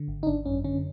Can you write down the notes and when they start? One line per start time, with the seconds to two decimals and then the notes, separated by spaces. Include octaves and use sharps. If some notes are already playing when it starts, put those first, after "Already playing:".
Already playing: D3
0.08 G#1
0.23 D#4
0.27 G#1 D4
0.46 F#2 C#4
0.64 D3 C#4